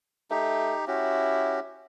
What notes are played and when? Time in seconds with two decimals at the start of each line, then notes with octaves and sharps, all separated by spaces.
0.31 A3 D#4 G4
0.87 C#4 E4 F#4 G4